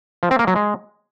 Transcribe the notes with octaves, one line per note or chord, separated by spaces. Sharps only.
F3
C4
A#3
F#3
G#3